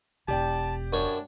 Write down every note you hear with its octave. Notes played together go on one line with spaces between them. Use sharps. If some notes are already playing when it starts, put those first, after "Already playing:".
E1 G4 D5 G5 A5
F#2 D4 C#5